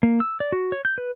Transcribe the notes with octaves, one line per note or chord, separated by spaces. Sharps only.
A#3
E6
D5
F#4
C#5
G6
B4